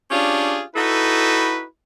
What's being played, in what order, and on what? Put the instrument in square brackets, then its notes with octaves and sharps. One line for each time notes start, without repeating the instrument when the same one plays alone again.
[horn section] C#4 D4 F4 G4 G#4
D#4 E4 F#4 A4 B4